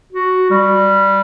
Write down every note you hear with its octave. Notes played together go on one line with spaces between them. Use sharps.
F#4
G3